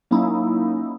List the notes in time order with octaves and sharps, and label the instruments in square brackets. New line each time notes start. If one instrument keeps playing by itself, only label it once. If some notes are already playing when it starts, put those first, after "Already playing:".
[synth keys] F#3 A#3 C#4 D#4 E4